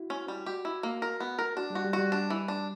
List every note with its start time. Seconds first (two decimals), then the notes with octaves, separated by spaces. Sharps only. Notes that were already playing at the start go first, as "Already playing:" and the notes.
Already playing: E4 F#4
0.10 C#4
0.28 G3
0.46 F#4 G4
0.65 E4
0.83 A#3
1.02 A#4
1.20 B3
1.39 A#4
1.57 D4 F#4
1.70 G3
1.75 F#4
1.85 G3
1.93 F#4
1.98 G3
2.12 G3 D4
2.30 E3
2.48 D4